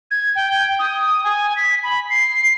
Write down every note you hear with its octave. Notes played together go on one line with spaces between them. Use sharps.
G#6
G5
D#6
G#5
B6
B5
C7